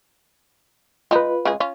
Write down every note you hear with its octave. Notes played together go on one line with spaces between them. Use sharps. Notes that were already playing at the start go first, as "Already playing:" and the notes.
G#3 D#4 F4 B4
C#3 G#3 G#4
C#4 F4